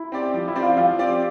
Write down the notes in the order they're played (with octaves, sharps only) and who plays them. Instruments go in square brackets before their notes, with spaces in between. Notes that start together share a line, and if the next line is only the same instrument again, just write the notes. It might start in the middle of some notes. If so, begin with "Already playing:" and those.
Already playing: [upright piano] E4
[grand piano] C4 G4 D5
F3
[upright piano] E4
[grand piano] C4 G4 D5
[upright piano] F4
[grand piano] F3 [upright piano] F4
[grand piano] C4 G4 D5